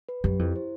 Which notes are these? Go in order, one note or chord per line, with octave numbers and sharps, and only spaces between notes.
B4
F#2 G4
F2 E4
C5